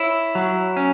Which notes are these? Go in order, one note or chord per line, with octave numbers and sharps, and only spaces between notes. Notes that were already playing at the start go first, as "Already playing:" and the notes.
Already playing: E4 C#5
F#3
C#4